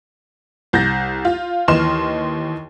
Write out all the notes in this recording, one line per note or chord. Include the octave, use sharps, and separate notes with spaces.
C2 G6 A6 A#6
F4
D#2 E3 D#5 C6 F6 E7